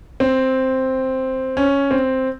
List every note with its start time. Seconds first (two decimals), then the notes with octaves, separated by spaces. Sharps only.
0.20 C4
1.57 C#4
1.91 C4